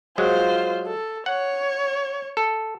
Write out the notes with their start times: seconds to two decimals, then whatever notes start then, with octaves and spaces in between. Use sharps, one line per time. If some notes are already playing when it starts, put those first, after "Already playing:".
0.18 F#3 G#3 F4 C5
0.86 A4
1.26 C#5 F#5
2.37 A4